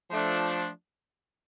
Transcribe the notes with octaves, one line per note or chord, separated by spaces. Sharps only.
F3 A3 D4